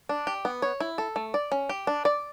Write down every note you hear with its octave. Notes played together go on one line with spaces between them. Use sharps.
D4
G4
B3
C#5
E4
A4
A3
D5
C#4
G4
D4
D5